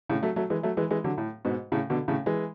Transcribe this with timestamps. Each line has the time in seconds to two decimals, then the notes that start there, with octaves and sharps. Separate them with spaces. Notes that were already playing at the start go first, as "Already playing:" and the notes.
0.09 A2 C#3
0.23 F#3 A3
0.36 F#3 A3
0.50 E3 G#3
0.63 F#3 A3
0.77 E3 G#3
0.91 E3 G#3
1.04 D3 F#3
1.18 A2
1.45 G#2 B2
1.72 A2 C#3
1.90 B2 D3
2.08 A2 C#3
2.26 E3 G#3